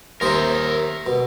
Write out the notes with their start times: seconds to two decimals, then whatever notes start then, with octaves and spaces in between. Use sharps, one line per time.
0.21 D#2 G#4 A#4 C5 E5
1.07 B2